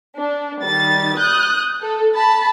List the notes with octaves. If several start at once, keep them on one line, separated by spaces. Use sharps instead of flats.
D4
D#3 G3 A6
D#6 F#6 G6
A4
A5 B5